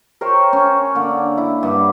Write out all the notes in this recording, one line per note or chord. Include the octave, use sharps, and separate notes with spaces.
A#4 C5 C#5 G5
C#4
D3 A#3
E4
G2 F#5 B5